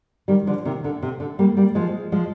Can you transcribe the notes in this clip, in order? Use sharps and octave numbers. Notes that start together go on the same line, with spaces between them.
D#3 G3
D3 F3
C3 D#3
D3
C3
D3
G3 A#3
G3 A#3
F3 G#3
F3 G#3